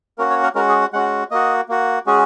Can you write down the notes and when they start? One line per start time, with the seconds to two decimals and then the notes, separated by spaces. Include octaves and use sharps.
0.18 A#3 C#4 F#4 A#4
0.30 C#5
0.43 A#4
0.55 G#3 C#4 F#4 A#4
0.69 G#4
0.81 F#5
0.93 G#3 C#4 F#4 F#5
1.31 A#3 F#4 D#5
1.69 A#3 F#4
2.06 G#3 C#4 F#4 G#4